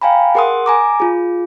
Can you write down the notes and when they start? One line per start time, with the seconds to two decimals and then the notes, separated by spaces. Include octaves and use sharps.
0.02 F5 G5 G#5 A#5 B5
0.35 G#4 A#4 F#5 C6 D#6
0.66 G#5 A#5 D6
1.00 F4 G#4